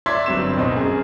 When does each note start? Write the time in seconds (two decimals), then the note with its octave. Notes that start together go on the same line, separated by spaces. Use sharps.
0.06 D5 E5 C6 E6 G#6 B6
0.26 G1 G2 F#3 C4 C6 E7
0.56 D1 B1 B2 C4 D#5
0.76 F#2 G#4